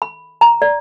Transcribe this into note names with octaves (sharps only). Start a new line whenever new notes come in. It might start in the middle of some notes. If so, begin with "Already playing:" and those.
B5
A#5
D5